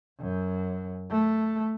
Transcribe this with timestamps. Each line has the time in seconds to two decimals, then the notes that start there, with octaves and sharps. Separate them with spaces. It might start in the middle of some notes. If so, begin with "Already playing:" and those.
0.20 F#2
1.11 A3